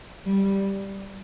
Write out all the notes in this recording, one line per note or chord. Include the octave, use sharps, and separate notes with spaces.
G3